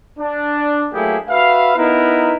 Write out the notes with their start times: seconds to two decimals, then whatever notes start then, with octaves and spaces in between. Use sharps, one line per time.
0.19 D4
0.93 F#3 A3 A#3 E4 G4 G#4
1.29 F#4 B4 E5 F5
1.76 B3 D#4 E4 A#4 B4